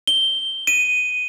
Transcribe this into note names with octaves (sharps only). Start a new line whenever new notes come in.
G7
D#7